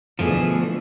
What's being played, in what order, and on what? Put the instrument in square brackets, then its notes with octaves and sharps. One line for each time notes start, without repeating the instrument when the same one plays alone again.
[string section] D2 E3 [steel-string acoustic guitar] B2 A3 G#4 [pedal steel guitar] F3